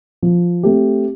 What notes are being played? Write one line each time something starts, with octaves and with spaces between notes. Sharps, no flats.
F3
A3 C4 G4